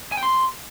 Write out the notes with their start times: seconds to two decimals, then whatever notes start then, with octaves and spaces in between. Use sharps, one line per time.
0.12 G#5
0.17 G5
0.23 C6